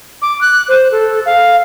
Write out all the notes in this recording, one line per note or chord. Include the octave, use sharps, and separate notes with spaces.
D6
F#6
C5
A4
F5